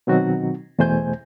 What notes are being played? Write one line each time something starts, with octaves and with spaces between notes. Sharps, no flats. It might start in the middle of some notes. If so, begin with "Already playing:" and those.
B2 D#3 F#3 C4 D#4 F#4
E2 B2 A3 C5 G#5 G6